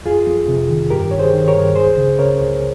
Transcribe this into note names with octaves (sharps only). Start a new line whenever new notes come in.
F2 F4 G#4
F2
C3
D#3
G2 G4 A#4
D#3 C#5
G#4 C5
D#3
A#4 C#5
G2
C#2 G#4 C5
C#3
C#3 A#4 C#5
C#2